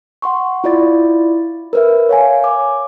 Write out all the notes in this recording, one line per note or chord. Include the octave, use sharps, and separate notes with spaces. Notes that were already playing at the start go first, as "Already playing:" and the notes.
F#5 C6 C#6
E4 F4 D5 A6
A#4 B4 E5
C#5 F5 G#5
D6